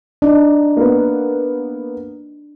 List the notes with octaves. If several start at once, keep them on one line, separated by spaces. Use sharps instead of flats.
D4 D#4
A#3 B3